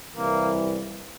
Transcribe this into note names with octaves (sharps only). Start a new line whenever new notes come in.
C2 C3 E3 A#3